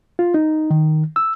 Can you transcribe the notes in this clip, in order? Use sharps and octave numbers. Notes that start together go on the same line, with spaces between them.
F4
D#4
D#3
E6